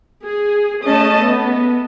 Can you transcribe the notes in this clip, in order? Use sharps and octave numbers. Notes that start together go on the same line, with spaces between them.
G#4
A3 C#4 D#5 A5
B3